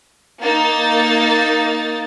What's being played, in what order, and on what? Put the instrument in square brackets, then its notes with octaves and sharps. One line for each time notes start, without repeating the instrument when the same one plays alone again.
[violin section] A#3 D#4 A6